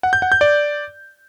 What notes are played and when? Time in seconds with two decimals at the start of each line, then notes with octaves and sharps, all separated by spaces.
0.03 F#5
0.13 G6
0.22 F#5
0.32 G6
0.41 D5